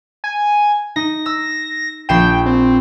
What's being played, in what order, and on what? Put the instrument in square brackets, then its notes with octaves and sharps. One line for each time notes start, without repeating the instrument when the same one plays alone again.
[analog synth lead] G#5
[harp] D#4 [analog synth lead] A#6
[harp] E6
[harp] A#1 C7 E7 [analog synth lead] G5
[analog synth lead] C4